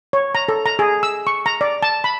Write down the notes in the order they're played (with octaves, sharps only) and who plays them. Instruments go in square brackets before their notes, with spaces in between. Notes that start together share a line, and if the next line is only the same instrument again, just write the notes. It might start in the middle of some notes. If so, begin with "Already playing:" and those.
[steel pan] C#5
A#5
A4
A#5
G#4
E6
C#6
A#5
D5
A5
B5